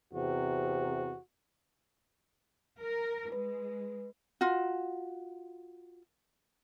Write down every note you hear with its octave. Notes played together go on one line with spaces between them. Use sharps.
E2 C3 F#4
A#4
G#3 B4
F4 F#4